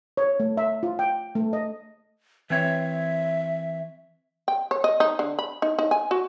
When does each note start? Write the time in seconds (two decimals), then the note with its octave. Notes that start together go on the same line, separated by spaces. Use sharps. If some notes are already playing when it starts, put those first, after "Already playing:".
0.17 C#5
0.40 A3
0.57 E5
0.83 F4
0.99 G5
1.35 A3
1.53 D#5
2.50 E3 C4 C#5 E5
4.48 G5
4.71 C#5
4.84 D#5
5.00 D#4
5.19 D3
5.39 B5
5.62 D#4
5.79 D#4
5.91 G#5
6.11 F#4